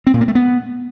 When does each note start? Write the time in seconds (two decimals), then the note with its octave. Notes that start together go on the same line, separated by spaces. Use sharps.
0.07 C4
0.14 A#2
0.21 A#3
0.28 A3
0.35 B3